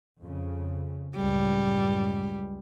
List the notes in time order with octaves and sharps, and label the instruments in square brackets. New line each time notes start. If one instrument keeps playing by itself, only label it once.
[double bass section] F2 C#3
[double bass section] C#2 F#2 A2 [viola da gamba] G3